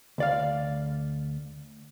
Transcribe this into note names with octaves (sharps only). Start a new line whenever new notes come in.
D2 D5 F5